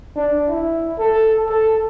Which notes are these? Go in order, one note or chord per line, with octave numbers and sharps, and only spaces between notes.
D4
E4
A4
A4